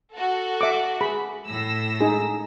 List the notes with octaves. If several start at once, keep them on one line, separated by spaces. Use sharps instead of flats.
F#4 A4
E5 D6
G#4 B5
A2 E6 A#6
D#4 G#4